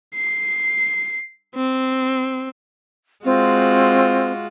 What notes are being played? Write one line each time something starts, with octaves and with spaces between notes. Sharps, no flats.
C7
C4
G#3 C4 F4 F#4